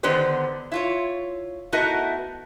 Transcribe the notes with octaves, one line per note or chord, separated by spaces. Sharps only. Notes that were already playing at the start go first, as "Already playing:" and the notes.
D3 D#3 B3 G4 C5 D5
E4 F4 C#5
A3 B3 D#4 E4 F#4 A#4